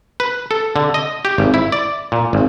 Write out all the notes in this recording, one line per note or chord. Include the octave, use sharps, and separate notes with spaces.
B4
A4
D3
D#5
G4
G#1
E4
D5
A#2
G#1